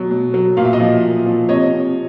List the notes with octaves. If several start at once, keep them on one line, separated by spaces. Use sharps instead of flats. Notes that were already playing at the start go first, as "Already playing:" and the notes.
Already playing: B2 F#3
B2
F#3
A#2 F5
E5
D#5 F5
F3
A#2
F3
C3 C#5 D#5
C3